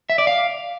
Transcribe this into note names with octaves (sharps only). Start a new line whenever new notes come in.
E5
D5
F5